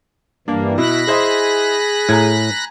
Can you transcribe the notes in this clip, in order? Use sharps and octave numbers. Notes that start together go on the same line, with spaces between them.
G2 E3 G3 A#3 D4
B2 E4 B5 F#6 A#6
E4 G#4 C5 D#5
A2 G#5 A#5 G#6